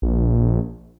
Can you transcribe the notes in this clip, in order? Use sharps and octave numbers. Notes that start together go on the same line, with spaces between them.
A#1